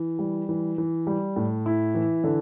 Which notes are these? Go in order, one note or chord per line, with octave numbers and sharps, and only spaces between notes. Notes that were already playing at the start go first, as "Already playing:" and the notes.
Already playing: E3
G3
E3
E3
G3
A2
E4
E3
D3